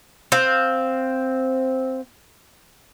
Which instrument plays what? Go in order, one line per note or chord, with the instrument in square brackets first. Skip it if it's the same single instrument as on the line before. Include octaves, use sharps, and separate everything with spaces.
[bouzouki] C4 F5